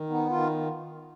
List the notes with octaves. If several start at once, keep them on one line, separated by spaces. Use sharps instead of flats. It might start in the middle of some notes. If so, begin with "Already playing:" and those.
Already playing: D#3
B3 D#4
D#3 F4